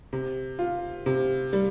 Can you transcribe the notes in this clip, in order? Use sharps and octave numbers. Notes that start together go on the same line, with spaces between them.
C3
F4
C3
G3